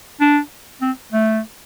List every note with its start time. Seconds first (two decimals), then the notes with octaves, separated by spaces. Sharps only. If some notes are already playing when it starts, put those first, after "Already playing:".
0.20 D4
0.82 C4
1.12 A3